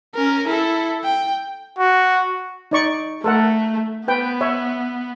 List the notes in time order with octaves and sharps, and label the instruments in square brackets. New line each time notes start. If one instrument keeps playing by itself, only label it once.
[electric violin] C#4 A#4
E4 A4
G5
[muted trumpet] F#4
[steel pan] D#4 D5 C#6
[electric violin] A3 [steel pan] A4 A#4 F#5
[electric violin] B3 [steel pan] B4 G5
[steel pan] C#5 E5